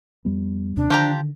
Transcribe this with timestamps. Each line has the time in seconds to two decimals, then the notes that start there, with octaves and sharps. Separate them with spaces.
0.25 F2 G3 B3
0.77 D#2 C3 C#4 D4
0.90 D3 D#3 F3 G4 A#5